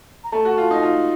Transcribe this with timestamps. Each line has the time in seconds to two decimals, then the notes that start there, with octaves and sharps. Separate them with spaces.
0.24 A#5
0.32 A3 A5
0.45 F#4
0.58 F4
0.71 D#4
0.83 F4